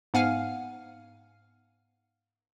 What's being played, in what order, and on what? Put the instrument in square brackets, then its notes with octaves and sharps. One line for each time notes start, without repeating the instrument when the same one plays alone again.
[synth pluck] G#2 B3 F5 F#5 G#5 F6